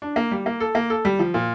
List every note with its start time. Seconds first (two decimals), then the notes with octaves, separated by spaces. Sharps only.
0.02 D4
0.16 A#3
0.31 G3
0.46 A#3
0.60 A4
0.75 A#3
0.90 A4
1.05 G3
1.19 F3
1.34 A#2